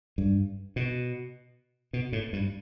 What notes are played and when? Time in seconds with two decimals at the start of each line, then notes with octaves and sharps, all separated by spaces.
0.18 G2
0.76 B2
1.93 B2
2.13 A2
2.33 G2